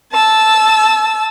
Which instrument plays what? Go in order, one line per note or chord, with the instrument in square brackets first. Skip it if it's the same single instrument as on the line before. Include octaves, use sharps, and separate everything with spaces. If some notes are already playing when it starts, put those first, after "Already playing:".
[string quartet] A5 E6